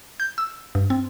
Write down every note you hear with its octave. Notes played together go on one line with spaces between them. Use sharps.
G6
E6
G2
C4